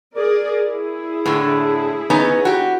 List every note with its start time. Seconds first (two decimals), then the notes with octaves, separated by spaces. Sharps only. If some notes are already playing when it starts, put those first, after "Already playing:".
0.16 G#4 A#4 D5
0.66 E4 G#4
1.26 A2 D3
2.10 B3 C#4 D#4
2.45 F#4 G4